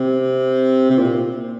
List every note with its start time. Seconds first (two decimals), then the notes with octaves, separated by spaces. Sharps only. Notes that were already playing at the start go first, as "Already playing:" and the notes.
Already playing: C3
0.90 C3
0.99 A#2